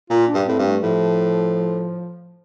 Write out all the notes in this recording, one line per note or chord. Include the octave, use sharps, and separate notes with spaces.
A#2 F4
D4
G2
A2 C4
G2
A3
A2 F3